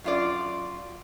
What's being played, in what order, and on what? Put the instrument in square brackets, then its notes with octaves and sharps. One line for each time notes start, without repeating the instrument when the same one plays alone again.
[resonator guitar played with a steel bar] F#2 F4 D5